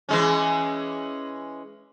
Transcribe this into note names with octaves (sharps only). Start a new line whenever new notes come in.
E3 G#3 C#4